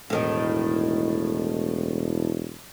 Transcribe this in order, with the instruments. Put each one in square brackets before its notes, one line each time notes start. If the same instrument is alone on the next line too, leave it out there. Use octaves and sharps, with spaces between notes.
[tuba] E1 [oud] A2 D#3